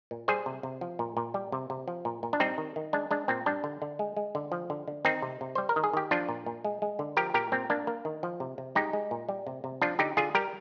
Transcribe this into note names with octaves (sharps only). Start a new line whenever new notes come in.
A#2
G3 G#4 C5
C3
C3
F3
A#2
A#2
G3
C3
C3
F3
A#2
A#2
D4
G3 C4 D#4
D#3
D#3
G#3 D4
G#3 D4
A#2 C4
G3 D4
D3
D3
G#3
G#3
D3
F3
D3
D3
D#3 C4 D#4
C3
C3
G3 C5
A#4
D#3
G#4
D#3 G4
F3 D4 F4
A#2
A#2
G#3
G#3
D3
F3 G4 A#4
A#2 G4 A#4
A#2 C4
A#3 D4
A#3
D#3
F3
C3
C3
G#3 D#4 G4
G#3
A#2
G3
C3
C3
F3 D4 F4
D3 D#4 G4
D3 F4 G#4
G3 G4 A#4